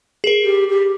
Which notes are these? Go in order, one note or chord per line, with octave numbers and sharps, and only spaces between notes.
G#4 A#4
G4
G4